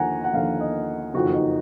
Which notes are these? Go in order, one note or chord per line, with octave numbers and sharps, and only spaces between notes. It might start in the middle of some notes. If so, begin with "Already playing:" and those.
Already playing: D#2 D3 F3 F#5 G#5 A#5
F#5
D#2 D3 F3 F5
D#5
F#1 F2 D#3 F#4
D#4